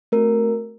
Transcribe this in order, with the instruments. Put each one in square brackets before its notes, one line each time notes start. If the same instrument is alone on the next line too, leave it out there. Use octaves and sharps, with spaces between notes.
[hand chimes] A3 C4 F#4 A#4